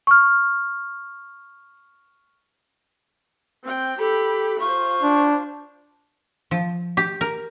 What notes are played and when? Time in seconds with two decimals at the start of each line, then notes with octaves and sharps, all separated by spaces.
0.07 C#6 F6
3.63 C4 G5
3.99 G4 A4 B5
4.60 F4 C5 C#6
5.03 D4
6.51 F3
6.97 G4
7.21 A#4